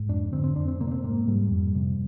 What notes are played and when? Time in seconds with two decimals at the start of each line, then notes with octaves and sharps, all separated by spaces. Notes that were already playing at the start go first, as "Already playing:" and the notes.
Already playing: G#2
0.09 F2 D4
0.32 D3 C4
0.44 C4
0.56 F2 D4
0.68 C4
0.80 C3 A#3
0.87 D4
0.92 C4
1.04 G#2 A#3
1.28 G#2 G3
1.51 F2
1.75 C3